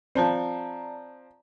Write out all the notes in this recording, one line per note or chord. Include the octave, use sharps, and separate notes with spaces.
F3 C4 D5 A5 A#5